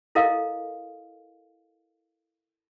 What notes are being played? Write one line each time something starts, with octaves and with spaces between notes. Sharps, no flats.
E4 A4 A#4 D#5 F5